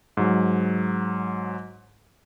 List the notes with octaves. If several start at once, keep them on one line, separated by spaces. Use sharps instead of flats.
G#2 F#3